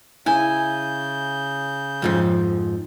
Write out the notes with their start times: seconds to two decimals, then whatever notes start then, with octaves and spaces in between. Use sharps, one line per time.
0.26 C#3 E4 G#5 G6
2.02 F2 G#2 F3